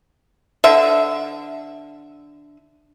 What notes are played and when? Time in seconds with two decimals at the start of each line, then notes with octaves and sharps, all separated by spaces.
0.64 D3 E5